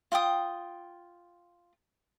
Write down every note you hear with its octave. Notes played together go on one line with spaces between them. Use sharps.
F4 F5 G5 D#6